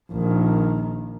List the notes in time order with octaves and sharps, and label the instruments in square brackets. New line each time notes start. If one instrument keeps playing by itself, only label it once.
[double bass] A#1 D#3